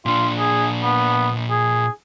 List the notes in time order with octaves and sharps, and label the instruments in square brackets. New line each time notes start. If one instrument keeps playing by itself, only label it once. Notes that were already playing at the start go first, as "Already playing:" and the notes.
[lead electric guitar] A#2 D4 [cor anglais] F4
[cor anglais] G#4
B3
G#4